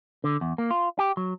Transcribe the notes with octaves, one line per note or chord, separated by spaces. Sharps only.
D3
E2
A#3
F4
G4
F#3